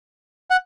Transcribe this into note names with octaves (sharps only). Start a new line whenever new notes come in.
F#5